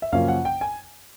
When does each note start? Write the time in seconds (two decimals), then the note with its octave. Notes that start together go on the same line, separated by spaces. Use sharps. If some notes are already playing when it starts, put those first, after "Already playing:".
0.02 E5
0.12 F#2 C#3 F3 A#3 C#4 F5
0.28 F#5
0.45 G5
0.61 G#5